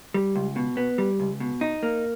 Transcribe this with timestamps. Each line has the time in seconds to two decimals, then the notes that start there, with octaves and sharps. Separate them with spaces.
0.14 G3
0.36 C#2
0.56 B2
0.77 B3
0.98 G3
1.20 C#2
1.40 B2
1.61 D#4
1.83 A#3